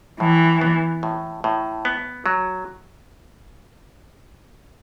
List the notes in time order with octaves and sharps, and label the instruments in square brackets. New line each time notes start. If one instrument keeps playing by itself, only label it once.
[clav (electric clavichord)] A2 [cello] E3
[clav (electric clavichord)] B3
A2
A2
B3
F#3